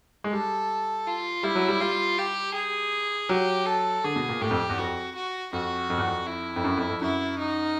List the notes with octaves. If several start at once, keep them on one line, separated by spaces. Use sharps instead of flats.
G#3
G3 A4
F4
G3 E4
F#3
G3
G3 F4
G4
G#4
F#3 G4
A4
D3 G#4
B2
A#2
A2 G4
F2
E2
F2 F#4
F#4
F2 F#4
F2
E2
F2
E4
F2
F#2
F2
F2
F#2 E4
D#4